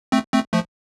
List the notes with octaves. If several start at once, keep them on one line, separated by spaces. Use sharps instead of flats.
A3 C4
A3 C4
F3 A3